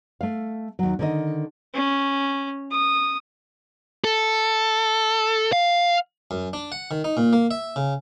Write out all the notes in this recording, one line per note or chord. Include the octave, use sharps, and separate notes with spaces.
A3 F5
D#2 F#3
D3 D#3 D#5
C#4
D#6
A4
F5
F#2
D4
F#5
D#3
D#4
A#2
A#3
E5
C#3